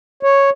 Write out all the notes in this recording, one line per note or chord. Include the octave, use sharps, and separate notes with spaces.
C#5